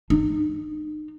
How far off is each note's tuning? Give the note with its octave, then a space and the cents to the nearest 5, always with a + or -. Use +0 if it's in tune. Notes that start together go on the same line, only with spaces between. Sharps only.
D#4 -35